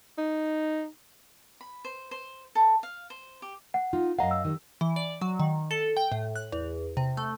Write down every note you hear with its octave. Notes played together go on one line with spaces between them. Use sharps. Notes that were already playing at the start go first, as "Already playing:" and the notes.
D#4
B5
C5
C5
A4
F5
C5
G4
F#5
D#4 F4
F#2 D#5 F5 F#5 A#5
E6
D#3 G3
E3
D5
F#3
D#3
A4
G5
A2
F#6
E2
C3
A3